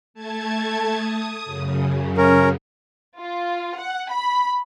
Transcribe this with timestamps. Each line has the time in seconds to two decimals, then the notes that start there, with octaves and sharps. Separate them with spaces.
0.14 A3 A5 G#6
0.94 D#6
1.45 F#2 C#3
2.18 C#4 A#4
3.19 F4
3.81 F#5
4.12 B5